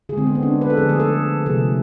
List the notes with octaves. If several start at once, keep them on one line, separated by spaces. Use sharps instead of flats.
D3 G#3 C4 G#4
B3
C4
D4
B4
A4
D3 F3 A3 G#4
G#4
A4
C3 F3 A3 G#4